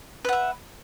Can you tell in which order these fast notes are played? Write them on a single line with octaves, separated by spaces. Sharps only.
B4 F#5 E5